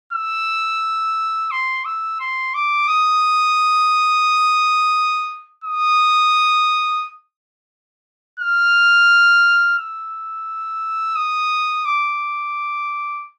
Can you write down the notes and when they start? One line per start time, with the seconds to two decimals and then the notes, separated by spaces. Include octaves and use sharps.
0.13 E6
1.51 C6
1.85 E6
2.20 C6
2.54 D6
2.88 D#6
5.64 D#6
8.40 F6
9.78 E6
11.16 D#6
11.85 D6